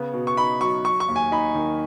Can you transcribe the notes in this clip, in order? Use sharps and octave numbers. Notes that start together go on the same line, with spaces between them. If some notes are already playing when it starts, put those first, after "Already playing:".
Already playing: C#3 B3
B2
C#6
D#4 B5
F#3 C#6
F#3 C#6
C#6
D#2
G#5
D#4 B5
D#3